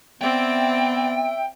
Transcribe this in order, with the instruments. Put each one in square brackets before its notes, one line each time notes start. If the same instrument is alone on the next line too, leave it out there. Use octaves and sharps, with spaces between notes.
[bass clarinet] B3 [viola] C4 D5 [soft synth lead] E5 [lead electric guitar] G5